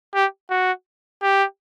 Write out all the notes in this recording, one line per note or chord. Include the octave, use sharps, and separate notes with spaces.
G4
F#4
G4